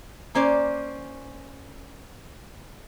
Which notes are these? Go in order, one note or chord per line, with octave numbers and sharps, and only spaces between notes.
A#3 C#4 C5 D5